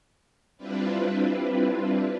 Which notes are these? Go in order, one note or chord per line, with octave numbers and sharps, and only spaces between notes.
G3 C4 D4 E4 F4 B4